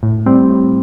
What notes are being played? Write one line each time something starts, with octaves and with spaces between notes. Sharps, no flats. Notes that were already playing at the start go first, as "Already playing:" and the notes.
A2
G3 C4
A2